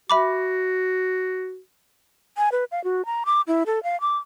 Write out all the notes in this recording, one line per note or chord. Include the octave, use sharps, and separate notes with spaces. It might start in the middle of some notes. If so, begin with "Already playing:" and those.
F#4 E5 B5 D6
G#5
B4
F5
F#4
A#5
D6
E4
A4
F5
D6